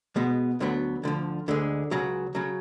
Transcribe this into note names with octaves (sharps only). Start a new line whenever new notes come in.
B2 G#3 B3
D2 D3 F#3 B3
D2 D3 F3
D2 D3 G#3
C#2 C#3 F#3
C#3 F#3